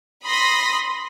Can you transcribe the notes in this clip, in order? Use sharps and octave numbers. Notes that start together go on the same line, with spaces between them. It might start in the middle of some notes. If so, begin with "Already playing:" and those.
B5 C6 D#6 A#6 B6